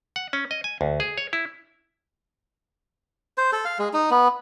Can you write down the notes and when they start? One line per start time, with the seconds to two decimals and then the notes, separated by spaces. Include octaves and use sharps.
0.16 F#5
0.33 C#4
0.51 D#5
0.64 G#5
0.81 D2
1.00 G#4
1.18 C#5
1.33 E4
3.38 C5
3.52 A4
3.65 F5
3.79 G#3
3.93 D#4
4.11 B3